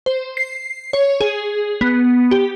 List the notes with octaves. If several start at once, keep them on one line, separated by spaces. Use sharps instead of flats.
C5
C7
C#5
G#4
B3
G4